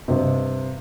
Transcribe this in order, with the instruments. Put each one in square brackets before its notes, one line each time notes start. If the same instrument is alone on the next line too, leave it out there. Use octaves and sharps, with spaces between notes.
[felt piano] G2 C3 D#5